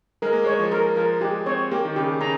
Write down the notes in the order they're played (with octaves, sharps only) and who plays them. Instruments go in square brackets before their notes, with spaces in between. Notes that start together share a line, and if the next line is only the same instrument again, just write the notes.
[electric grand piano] G#3 [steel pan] A#4
[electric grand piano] A#3
[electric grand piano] G#3 [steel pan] C#5
[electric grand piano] F3
[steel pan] A#4
[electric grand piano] F3 [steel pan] A#4
[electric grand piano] G#3 [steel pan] G4
[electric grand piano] C4 [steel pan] C#5
[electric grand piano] A#3 [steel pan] G4
[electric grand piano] D#3
[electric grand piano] C#3 [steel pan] G4
[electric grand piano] C#3 [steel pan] A#5